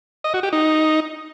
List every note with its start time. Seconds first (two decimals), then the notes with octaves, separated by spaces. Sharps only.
0.24 D#5
0.34 F#4
0.43 G4
0.53 D#4